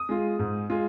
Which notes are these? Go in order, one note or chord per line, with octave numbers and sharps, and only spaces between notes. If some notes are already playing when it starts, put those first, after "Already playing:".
Already playing: D#6
G#3 F4
G#2
G#3 F4